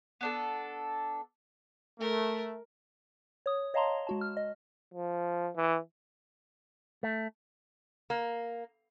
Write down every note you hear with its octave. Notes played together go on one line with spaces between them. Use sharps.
B3 D4 A4
A3 A#4
C#5 D#6
C#5 D#5 F5 A5 A#5 C6
G#3 F#4 A5
F6
D#5
F3
E3
A3
A#3